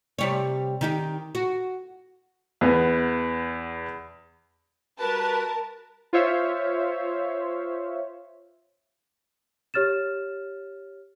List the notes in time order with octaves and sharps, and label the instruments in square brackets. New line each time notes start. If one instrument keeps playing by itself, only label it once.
[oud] C3 G3 C#5
D#3 D#4 G4
F#4
[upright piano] E2 B3
[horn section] G3 F#4 B4 [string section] A#4 A5
[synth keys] F4 C5 C#5 E5 F5
[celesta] G4 C#5 F6 A6 E7